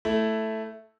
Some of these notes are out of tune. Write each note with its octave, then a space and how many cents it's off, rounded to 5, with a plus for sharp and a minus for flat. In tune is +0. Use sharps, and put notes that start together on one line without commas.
A3 +0 E4 +0